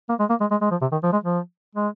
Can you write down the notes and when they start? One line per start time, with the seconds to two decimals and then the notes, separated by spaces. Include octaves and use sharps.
0.09 A#3
0.19 G#3
0.30 A#3
0.41 G#3
0.51 G#3
0.61 G#3
0.71 F3
0.81 C3
0.92 D#3
1.03 F3
1.13 G#3
1.24 F3
1.75 G#3